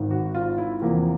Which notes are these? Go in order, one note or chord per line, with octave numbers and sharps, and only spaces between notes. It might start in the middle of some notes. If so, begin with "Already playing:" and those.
Already playing: G#1 G#2 D#3
F#4
F4
E4
E2 C3 F3 A#3